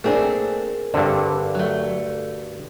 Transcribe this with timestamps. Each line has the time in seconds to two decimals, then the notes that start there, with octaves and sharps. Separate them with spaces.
0.04 A3 A#3 C4 D4 G#4
0.94 G2 D3 C4
1.55 F#3 A3